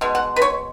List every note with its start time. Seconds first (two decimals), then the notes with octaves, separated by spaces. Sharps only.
0.01 B2 G#3
0.15 F#5
0.36 B4
0.42 C#5